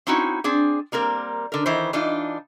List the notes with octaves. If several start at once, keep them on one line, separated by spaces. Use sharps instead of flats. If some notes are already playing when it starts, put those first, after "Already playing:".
C4 C#4 D#4 E4 F#4
C4 D4 G#4
G3 A#3 C4 A#4
D3 A#4
D#3 E3 B4 C5
E3 D4 D#4 F4